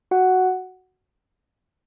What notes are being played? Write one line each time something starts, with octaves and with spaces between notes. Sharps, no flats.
F#4 F#5